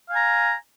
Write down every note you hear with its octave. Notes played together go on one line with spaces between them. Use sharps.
F5 G#5 A#5